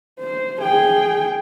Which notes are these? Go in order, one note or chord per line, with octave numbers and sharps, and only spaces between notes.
C5
G#4 G5